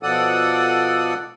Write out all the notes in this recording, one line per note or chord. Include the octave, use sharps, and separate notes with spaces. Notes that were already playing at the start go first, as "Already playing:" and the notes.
B2 F3 A4 D5 F#5 D#6